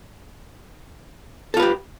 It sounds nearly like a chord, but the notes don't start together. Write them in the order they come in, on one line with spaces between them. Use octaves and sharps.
A4 F4 B4 G4